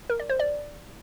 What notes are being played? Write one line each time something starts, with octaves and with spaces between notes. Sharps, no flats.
A#4
D5
C5
D5